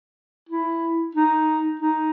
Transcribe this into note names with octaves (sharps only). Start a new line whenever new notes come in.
E4
D#4
D#4